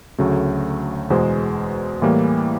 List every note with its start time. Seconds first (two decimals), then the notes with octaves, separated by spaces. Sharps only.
0.18 D2 C#3 F#3 A3
1.10 E2 B2 G#3 C5
2.02 A2 E3 G3 A#3